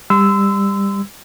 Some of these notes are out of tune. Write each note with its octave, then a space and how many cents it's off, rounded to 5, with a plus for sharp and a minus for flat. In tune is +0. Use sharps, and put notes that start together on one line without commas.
G3 +20 C6 -35 E6 +0